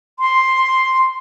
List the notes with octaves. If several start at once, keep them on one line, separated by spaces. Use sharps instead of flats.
C6